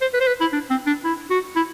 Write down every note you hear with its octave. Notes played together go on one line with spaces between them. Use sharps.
C5
B4
C5
B4
E4
D4
C4
D4
E4
F#4
E4